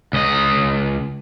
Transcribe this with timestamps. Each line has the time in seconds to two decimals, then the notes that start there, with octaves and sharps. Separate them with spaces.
0.13 C#2 D#5